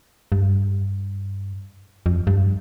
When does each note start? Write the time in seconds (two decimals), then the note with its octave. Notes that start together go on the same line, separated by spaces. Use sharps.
0.32 G2
2.06 F2
2.27 G2